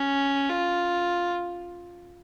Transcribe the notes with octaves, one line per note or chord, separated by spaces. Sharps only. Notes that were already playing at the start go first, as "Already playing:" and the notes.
Already playing: C#4
F4